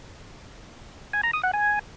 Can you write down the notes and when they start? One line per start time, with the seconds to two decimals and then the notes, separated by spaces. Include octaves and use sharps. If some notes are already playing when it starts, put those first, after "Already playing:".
1.13 G#5
1.23 A#5
1.33 D#6
1.43 F#5
1.53 G#5